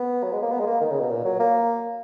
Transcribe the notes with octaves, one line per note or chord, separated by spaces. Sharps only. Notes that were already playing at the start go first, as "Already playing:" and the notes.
Already playing: B3
F#3
G#3
A#3
B3
G#3
A#3
D#3
C#3
B2
A#2
F#3
A#3